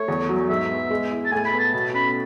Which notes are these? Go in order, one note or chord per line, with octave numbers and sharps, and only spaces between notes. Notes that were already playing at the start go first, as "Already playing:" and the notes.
Already playing: A3 C#5
E2
F#3
G#2 E5
B3
G#3
E4
A5
A2 G#5
B5
B3
A5
B2 A5
C#4 B5